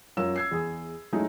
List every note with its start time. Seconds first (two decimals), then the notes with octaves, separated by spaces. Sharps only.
0.17 F#2 F4 A#4 C#5 E6 E7
0.36 E6 G#6 C7
0.51 E2 G#4
1.13 F#3 G#3 A3 D#4 E4